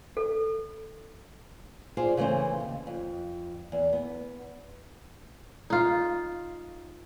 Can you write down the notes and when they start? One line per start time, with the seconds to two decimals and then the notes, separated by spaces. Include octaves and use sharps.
0.17 A4
1.97 F4 G#4 C5 D5
2.17 C#3 E3 A3 C4 C5
2.60 D#2
2.87 F2
3.72 E2
3.93 B3
5.70 D#4 F4